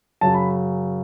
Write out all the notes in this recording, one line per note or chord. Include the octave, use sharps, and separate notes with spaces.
F#2 C#3 F#3 A5
B5